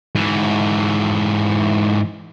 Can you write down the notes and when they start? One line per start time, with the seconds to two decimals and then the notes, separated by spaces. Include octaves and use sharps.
0.15 G#2 E3